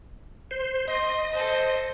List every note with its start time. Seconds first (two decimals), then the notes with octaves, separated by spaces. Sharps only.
0.51 C5
0.88 D#5 C6
1.32 A4 C5